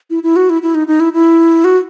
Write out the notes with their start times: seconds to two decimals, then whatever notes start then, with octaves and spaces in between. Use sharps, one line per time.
0.10 E4
0.23 E4
0.36 F#4
0.50 E4
0.62 E4
0.75 D#4
0.87 D#4
1.00 E4
1.13 E4
1.64 F#4